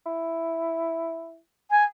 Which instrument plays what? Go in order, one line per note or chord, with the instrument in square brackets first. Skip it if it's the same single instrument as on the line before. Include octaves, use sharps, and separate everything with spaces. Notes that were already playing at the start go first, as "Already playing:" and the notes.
[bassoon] E4
[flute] G#5